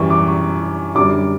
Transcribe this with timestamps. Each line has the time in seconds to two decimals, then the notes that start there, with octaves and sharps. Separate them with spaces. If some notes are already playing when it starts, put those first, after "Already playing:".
Already playing: F#2 E3 G3 G5 C#6
0.10 D6
0.27 C#6
0.95 F#2 D3 G3 D6